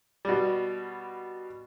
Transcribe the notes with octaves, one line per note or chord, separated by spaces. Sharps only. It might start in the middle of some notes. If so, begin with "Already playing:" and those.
B2 G3